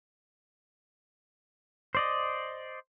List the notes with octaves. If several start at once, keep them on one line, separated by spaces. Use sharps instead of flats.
C5 D5 D#5